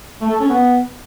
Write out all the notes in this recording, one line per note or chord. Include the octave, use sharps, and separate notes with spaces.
A3
A4
C#4
B3